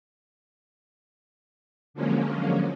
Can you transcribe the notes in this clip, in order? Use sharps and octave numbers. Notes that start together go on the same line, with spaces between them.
D3 F3 F#3 G#3 A#3 C#4